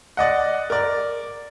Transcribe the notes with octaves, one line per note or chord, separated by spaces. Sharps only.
D5 D#5 F#5
A#4 D5